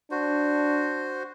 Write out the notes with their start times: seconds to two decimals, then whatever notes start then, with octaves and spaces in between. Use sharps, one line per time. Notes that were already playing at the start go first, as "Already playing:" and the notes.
0.11 D4 F#4 C5